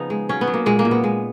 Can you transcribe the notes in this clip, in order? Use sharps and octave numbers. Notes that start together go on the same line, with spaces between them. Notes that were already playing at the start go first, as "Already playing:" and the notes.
Already playing: C#3 F3 B3 D#4
G#3
F#3 C#4
B3
F#3
A#3
A#2 G#3
A#3
A#2
B3
G#3